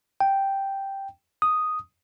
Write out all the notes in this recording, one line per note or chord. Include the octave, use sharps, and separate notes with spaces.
G5
D#6